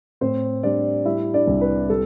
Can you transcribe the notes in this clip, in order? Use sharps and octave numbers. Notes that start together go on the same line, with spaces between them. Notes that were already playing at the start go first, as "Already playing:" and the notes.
A2 C4 C5
G3 D4 D5
G3 E4 E5
D4 D5
C2
B4
G3 A4